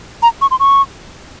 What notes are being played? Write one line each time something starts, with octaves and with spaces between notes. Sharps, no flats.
A#5
C#6
C6
C#6